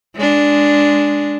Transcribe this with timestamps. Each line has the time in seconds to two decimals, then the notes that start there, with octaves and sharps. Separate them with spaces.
0.16 G#3 D4